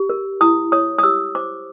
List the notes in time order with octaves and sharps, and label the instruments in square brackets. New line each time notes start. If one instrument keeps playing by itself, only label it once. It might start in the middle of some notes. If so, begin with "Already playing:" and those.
Already playing: [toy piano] G4
A#4
E4 D#6
C#5 D#6
D#6
G4 E6
C5 D6